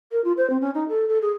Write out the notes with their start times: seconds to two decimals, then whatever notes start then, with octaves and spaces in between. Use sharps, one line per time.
0.12 A#4
0.24 F4
0.37 C5
0.50 C4
0.61 C#4
0.74 D#4
0.89 A4
1.08 A4
1.22 G#4